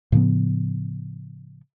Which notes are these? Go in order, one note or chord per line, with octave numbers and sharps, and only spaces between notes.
A2 C#3 F3 B3